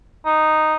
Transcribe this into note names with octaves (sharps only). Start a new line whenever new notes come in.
D#4